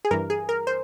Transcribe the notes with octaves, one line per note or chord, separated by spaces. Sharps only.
G#4
G2 E3 A#4
G#4
A#4
C5